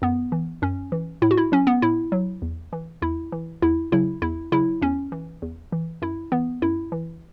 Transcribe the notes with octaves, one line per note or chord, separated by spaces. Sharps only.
F#2 B3
E3
F#2 C#4
E3
A2 E4
F#4
E4
F#3 C#4
B3
A2 E4
F#3
E2
E3
E2 E4
E3
E2 E4
C#3 F#3 E4
E2 E4
C#3 F#3 E4
E2 C#4
E3
E2
E3
F#2 E4
E3 B3
F#2 E4
E3